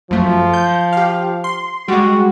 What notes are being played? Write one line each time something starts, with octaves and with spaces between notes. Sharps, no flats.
F#2 F3 A3
G6
G4 F5
C6
G3 G#3 F#4